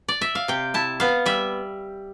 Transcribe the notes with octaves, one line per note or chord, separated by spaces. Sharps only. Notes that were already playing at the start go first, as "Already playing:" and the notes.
D5
E5
F5
C3 G5
E4 A5
B3 F5
G3 E5